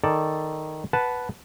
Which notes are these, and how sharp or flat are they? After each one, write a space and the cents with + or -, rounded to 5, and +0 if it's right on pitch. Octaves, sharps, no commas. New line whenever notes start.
D#3 +0 A4 +0 D5 +0
B4 +0 F#5 +0 A5 -10